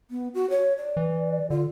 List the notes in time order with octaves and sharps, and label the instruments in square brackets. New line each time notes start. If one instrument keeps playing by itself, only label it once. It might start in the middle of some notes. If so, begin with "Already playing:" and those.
[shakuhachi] B3
F#4
C#5
D5
[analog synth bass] E3
[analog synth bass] D3 [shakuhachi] F4